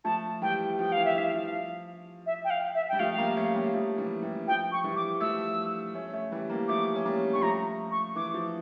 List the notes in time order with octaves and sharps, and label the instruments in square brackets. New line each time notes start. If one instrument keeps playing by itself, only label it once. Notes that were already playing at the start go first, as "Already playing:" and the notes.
[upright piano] F3 A3 [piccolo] A5
[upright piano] E3 G3 [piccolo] G5
[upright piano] F3 [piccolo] G5
[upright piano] E3 [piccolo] F5
[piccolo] E5
[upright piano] E3 [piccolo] F5
[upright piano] F3
[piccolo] E5
G5
F5
E5
[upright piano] G3 [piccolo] G5
[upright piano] F3 A3 [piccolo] F5
[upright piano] G3 A#3
A3 C#4
G3 A#3
F3 A3
E3 G3
E3 G3
[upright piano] F3 [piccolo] G5
[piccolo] C#6
[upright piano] E3 G3
[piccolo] D6
[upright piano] F3 A3 [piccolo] E6
[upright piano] A3 C#4
A3 C#4
E3 G3
G3 A#3
[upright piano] F3 A3 [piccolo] D6
[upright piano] C#4
G3 A#3
[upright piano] G3 [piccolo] C#6
[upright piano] F3 A3 [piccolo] A#5
[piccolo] C#6
[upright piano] E3 [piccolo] D6
[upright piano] F3